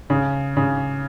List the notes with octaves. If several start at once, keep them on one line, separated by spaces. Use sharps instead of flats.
C#3
C#3